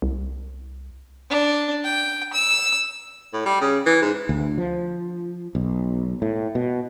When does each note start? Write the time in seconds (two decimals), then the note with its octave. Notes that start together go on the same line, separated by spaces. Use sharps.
0.02 C2
1.30 D4
1.84 G5
2.33 E6
3.34 A2
3.46 G3
3.61 C#3
3.86 E3
4.02 G#2
4.29 D2
4.58 F3
5.55 B1
6.22 A2
6.55 B2